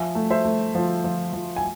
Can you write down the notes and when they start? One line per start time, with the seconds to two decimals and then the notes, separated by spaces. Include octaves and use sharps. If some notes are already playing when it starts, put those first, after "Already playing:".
Already playing: F3 E5 G#5
0.15 A3
0.30 C5 E5
0.45 A3
0.75 F3
1.04 F3
1.33 F3
1.56 G#5